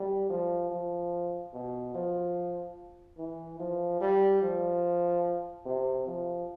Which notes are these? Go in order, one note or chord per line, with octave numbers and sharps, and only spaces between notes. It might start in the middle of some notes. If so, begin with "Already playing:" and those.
Already playing: G3
F3
F3
B2
F3
E3
F3
G3
F3
C3
F3